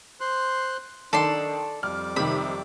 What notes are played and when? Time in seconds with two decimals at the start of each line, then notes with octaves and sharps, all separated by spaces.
0.20 C5 C6 F#6
1.13 D#3 D4 A4 D5 C6
1.83 F2 G3 D6 F6
2.16 C3 D#3 B5